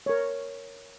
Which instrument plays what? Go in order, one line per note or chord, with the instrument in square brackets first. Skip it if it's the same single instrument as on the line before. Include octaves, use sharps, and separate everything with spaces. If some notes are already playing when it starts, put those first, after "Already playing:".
[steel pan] A#4 C#5